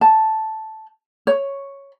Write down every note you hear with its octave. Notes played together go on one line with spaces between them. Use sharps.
A5
C#5